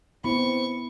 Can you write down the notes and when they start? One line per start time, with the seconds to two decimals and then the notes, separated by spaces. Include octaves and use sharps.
0.24 B3 C4 E4 B5 C#6